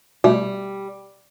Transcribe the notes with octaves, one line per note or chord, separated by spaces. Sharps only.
B2 G3 A3